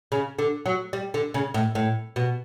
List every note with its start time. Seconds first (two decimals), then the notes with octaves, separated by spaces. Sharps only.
0.12 C#3
0.39 D3
0.66 F#3
0.93 G3
1.14 D3
1.34 C#3
1.54 A2
1.75 A2
2.16 B2